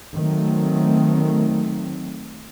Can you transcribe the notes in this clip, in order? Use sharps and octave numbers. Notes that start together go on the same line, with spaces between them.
D#3 F#3 A3 C4